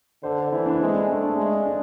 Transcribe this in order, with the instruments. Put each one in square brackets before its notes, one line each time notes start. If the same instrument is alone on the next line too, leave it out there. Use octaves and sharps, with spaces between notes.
[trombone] D3 [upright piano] C5
[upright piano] A4
[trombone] E3 [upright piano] E4
[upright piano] D4
[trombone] G#3 [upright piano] C4
[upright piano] D4
[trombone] A3 [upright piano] D4
[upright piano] D4
[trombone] G#3
[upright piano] D4